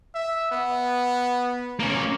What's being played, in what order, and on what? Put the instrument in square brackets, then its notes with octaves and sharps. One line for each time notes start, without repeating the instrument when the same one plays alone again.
[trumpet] E5
B3
[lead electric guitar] A#3 C#4